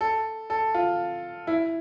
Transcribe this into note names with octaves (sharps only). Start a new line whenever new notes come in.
A4
A4
F4
E4